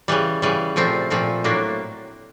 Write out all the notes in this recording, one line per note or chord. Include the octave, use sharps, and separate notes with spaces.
C#3 E3 G3
C#3 E3 G3
A#2 F3 A3 C4
A#2 F3 A3 C4
A2 F#3 A#3 D4